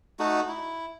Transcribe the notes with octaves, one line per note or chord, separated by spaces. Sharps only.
A3 D#4 F#4
E4